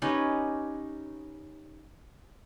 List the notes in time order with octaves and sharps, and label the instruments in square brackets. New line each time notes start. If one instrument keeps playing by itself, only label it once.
[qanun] C#4 D#4 G4 B4